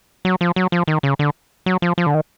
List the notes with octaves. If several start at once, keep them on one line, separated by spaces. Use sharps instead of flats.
F#3
F3
F#3
F3
D#3
C#3
D3
F#3
F3
F3
D3
D#3